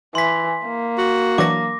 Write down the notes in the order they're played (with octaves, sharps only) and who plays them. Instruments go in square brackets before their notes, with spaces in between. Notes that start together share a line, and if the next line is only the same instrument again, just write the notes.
[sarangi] E3 [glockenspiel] C6 B6
[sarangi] A#3
[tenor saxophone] F#4
[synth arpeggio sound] E3 F#3 D4 [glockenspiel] D6 A#6